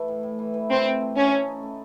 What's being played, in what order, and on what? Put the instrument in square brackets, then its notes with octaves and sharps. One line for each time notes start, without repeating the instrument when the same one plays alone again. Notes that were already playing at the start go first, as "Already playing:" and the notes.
Already playing: [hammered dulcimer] E3 A3
A2
A2
E3
E3
[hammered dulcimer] A3 [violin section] C4
[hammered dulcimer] C4
A3
[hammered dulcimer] A3 [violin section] C#4
[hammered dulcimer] A3
D#4
A3